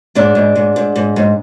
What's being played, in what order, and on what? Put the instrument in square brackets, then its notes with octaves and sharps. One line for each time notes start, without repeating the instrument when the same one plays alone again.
[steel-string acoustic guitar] G#2 D4
G#2
G#2
G#2
G#2
G#2